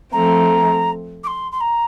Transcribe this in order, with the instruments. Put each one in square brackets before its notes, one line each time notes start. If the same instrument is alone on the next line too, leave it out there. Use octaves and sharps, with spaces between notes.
[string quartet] F3 A3 C4 [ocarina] A#5
[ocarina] D6
C6
C6
A#5